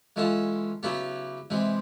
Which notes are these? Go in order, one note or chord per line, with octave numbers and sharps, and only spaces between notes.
E3 G#3 C#4 F4 A4
C#3 F#3 B3 E4 G4
C3 E3 G#3 C4